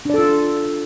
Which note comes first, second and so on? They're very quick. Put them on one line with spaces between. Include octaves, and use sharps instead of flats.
D4 D5 A4 F4